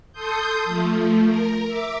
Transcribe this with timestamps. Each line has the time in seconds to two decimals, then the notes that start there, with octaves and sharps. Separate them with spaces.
0.12 A4 C6 D#6 G6
0.65 F3 A3
1.23 A#4
1.67 E5 D6